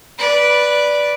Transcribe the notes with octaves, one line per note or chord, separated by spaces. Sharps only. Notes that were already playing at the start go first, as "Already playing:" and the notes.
B4 D5